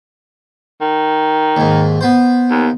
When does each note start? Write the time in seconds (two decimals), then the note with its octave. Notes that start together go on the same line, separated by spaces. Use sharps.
0.81 D#3
1.57 D#2 G#2
2.01 B3 C5
2.51 D#2